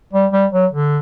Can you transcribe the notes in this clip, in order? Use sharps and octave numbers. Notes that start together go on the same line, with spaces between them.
G3
G3
F#3
D3